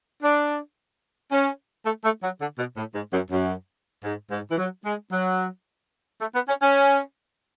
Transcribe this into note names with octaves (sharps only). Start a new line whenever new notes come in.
D4
C#4
A3
A3
F#3
D3
B2
A2
G#2
F#2
F#2
G#2
G#2
E3
F#3
G#3
F#3
A3
B3
C#4
C#4